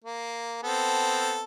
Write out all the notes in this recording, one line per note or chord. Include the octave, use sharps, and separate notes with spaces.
A#3
B3 C4 A4